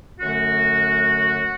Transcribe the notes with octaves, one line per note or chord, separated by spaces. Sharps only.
F#2 D3 A3 F#4